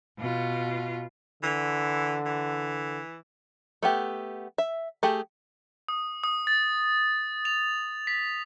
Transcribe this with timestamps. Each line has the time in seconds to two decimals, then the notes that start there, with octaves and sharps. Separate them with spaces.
0.19 B2 F4
1.43 D3 E3
2.26 E3
3.83 A3 B3 G4
4.58 E5
5.03 A3 G4 G#4
5.88 D#6
6.24 D#6
6.47 A6
7.45 F7
8.07 B6